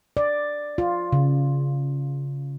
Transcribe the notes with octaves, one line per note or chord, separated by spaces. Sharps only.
D5
F4
C#3